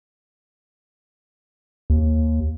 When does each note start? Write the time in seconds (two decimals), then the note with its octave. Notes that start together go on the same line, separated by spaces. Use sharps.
1.90 D#2